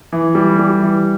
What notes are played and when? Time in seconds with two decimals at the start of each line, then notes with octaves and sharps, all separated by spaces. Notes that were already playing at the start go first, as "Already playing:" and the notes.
0.12 E3
0.35 G3
0.59 G3
0.82 E3